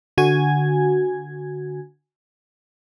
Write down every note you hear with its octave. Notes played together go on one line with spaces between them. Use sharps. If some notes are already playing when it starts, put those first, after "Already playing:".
D3 F#4 G#5 G#6